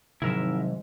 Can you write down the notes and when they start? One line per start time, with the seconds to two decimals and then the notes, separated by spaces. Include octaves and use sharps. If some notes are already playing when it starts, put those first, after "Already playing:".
0.22 G#1 G#2 C3 F3 F#3 E4 A#4 E5